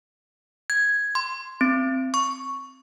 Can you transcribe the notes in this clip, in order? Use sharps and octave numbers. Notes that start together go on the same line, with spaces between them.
G#6
C6
C4
C#6